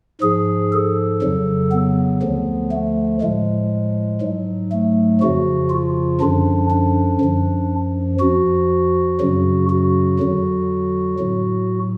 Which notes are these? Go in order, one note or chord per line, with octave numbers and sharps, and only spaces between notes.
G#2 F3 G#4
A4
F2 C#3 F#3
B3
D2 D3 F3
A3
A2 F3 G#3
G#2 F#3
A3
F2 C#3 F3 F#4
F4
F#2 D3 F3 D4
D4
F#2 F3
F2 F3 F#4
F#2 C#3 F#3
F#4
F2 D3 F#3
A2 F#3